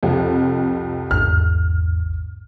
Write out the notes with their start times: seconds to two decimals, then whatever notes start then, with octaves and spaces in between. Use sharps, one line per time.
0.03 C2 F2
1.11 A1 E2 G#2 F6